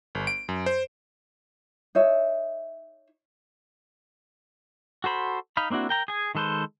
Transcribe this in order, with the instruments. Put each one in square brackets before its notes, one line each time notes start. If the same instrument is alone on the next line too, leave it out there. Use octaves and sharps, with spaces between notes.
[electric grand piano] G1
D7
F#2
C5
[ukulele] D#4 C#5 E5
[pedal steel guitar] F#4 A4 C5 B5
D#4 F5 B5
A#3 C4 D4 E4 F#4
A#4 G5 A#5
G#4 G#5
D#3 G#3 A4 B4 C5